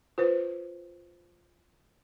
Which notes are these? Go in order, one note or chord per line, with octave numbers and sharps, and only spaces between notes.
F4 B4 C5